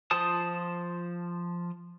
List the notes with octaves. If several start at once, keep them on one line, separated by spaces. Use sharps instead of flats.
F3 F4 C5 A5 D#6